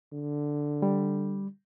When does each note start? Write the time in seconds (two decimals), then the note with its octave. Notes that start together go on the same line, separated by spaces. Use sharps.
0.12 D3
0.82 G3